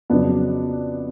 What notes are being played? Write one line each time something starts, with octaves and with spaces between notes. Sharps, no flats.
F2 C#3 F#3 B3 D4